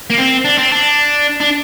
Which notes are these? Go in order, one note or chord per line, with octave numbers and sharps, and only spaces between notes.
A#3
C4
D4
C4
D4
D4